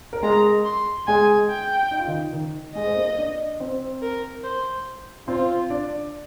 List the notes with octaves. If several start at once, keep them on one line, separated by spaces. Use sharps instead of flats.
A#4
G#3 G#4 A#5
C6
G#3 G#4 G#5
G5
D#4
F4
D#3 D#4
D#3 D#4
G#3 G#4 D#5
C5
A#3 A#4
D4 D5
C4 C5
A#4
C5
C4 F4 C5
D4 D5